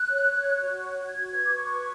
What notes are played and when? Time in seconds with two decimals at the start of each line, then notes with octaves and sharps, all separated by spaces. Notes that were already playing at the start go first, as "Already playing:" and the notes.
Already playing: F#6
0.08 C#5
0.33 C#5
0.57 F#4
0.82 C#5
1.06 F#4 G#6
1.30 B4 G#6
1.43 D6
1.55 B4 C#6
1.79 B4